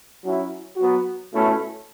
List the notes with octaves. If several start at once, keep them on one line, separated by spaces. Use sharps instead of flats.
F#3 C#4 E4
F#3 B3 F#4
B2 A3 C#4 E4